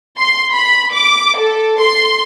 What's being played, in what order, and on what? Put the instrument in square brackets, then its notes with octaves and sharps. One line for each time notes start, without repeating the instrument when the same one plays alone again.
[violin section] C6
B5
D6
A4
C6